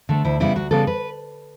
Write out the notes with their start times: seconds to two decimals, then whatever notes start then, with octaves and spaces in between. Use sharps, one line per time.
0.09 D3 A3
0.24 D2 E4
0.40 C#3 G3 B3 E4
0.55 D2 F#4
0.71 C#3 G3 B3 A4
0.87 B4